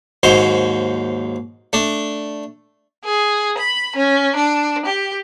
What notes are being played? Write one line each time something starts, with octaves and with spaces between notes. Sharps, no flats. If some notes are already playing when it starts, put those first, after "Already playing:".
D#2 G#2 F#3 C5
A3 D4
G#4
B5
C#4
D4
G4